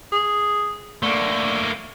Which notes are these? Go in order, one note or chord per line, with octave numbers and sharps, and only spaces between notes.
G#4
D3 A3 A#3